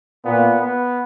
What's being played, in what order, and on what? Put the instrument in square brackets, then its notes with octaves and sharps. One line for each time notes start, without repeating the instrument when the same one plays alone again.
[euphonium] A#2 [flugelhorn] B3
[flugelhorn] B3